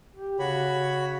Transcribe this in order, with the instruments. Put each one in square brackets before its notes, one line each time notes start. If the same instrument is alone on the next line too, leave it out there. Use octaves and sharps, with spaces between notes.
[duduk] G4
[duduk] C#3 [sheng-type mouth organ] F#4 C#5 B5